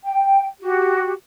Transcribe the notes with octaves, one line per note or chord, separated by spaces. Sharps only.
G5
F#4 G4